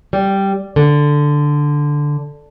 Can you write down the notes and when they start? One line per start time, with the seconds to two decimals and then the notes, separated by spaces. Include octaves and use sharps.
0.13 G3
0.76 D3